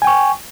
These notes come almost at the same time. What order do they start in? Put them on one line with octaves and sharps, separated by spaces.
G#5 G5 C#6